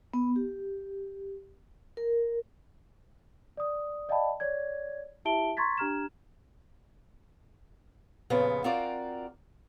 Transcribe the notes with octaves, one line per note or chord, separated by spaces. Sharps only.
B3
G4
A#4
D5 D#6
D5 D#5 F5 G5 A5 B5
C#5 D5 G#6
E4 G4 E5 A5 D7 G7
A#5 C6 C#6 G#6 A6 B6
D4 G4 A#5 F6 G#6 E7
F2 A#2 C#3 B3
C4 F4 F#4 A#4 D5